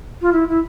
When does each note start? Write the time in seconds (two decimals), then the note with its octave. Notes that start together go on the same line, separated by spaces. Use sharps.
0.21 F4
0.32 E4
0.48 E4